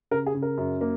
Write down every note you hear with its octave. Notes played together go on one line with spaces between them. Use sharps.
C#3 A#4
G#4
C#3
A#4
F#2
A#3